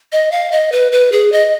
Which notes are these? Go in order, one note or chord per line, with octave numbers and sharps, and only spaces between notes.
D#5
F5
D#5
B4
B4
G#4
D#5